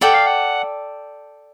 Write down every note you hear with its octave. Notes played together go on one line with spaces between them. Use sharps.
A4 D5 F#5 G5
F5
F#5